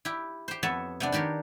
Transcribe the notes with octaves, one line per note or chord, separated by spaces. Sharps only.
E4 G4
G4 C5
F2 B3 C#5 E5 A5
C3 B3 D4
D#3 D4 G4 A#4 C#5